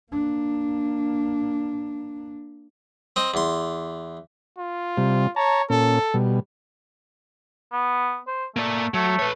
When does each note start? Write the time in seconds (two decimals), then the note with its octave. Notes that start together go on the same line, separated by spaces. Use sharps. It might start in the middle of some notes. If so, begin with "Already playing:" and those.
0.12 A#3 D4
3.16 C4 D#5
3.34 E2 C6
4.57 F4
4.97 C3 G3
5.36 C#5 A5 A#5
5.70 A#2 C#4 A4
6.14 B2 G3
7.72 B3
8.27 C5
8.56 A3 A#3 D5
8.94 F#3 A3
9.19 B4 C#5